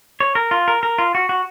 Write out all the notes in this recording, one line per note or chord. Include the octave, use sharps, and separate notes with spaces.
C#5
A#4
F4
A#4
A#4
F4
F#4
F#4